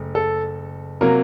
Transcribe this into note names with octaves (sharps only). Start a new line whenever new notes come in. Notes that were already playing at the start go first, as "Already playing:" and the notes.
Already playing: F#1 A3
A4
C3 F#3 A#3 A#4